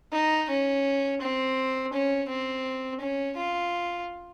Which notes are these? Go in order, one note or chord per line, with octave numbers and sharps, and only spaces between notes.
D#4
C#4
C4
C#4
C4
C#4
F4